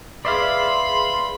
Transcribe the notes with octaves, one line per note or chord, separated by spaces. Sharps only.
G#4 B4 D5 E5 F5 B5 C6